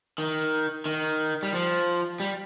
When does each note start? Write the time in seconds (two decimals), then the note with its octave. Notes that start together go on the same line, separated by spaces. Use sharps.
0.18 D#3
0.86 D#3
1.43 G3
1.53 F3
2.20 G3